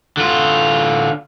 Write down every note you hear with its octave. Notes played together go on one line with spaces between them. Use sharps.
D3 F4